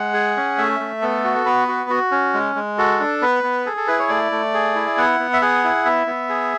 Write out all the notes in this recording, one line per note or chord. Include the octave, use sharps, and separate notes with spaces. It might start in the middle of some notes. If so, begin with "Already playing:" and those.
Already playing: G#3 F#5
G#4
C#4
A3 E5
A3
B3 A4
F#4
B3 B4
F#4
F#4
C#4
G#3
G#3
F#4 A4
D4
B3 B4
B3
G#4 A4
A4
E4 B4
C#5
A3 D5
A3
G#4
E4
B3 F#5
B3
E5
G#4 F#5
E4
B3 E5
B3
G#4